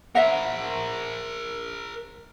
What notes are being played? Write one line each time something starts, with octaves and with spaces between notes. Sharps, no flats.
A#4 C5 E5 F#5